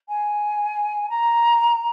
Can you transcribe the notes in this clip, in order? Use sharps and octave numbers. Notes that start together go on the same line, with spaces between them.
G#5
A#5